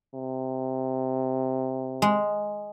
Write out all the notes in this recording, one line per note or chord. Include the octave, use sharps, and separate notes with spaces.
C3
G#3